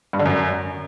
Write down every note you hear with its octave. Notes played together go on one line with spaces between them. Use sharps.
G2
D3
F#2